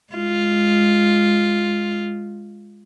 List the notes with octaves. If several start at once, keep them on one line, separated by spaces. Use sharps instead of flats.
G#3 F4